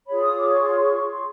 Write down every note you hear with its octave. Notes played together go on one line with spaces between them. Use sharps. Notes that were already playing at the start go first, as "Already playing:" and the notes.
F4 G#4 C#5 B5
D#6
D6
C#6
C6
C#6
C#6
C6